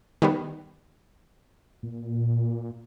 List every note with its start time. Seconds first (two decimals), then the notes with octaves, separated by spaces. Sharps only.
0.22 D#3 G3 B3
1.83 A#2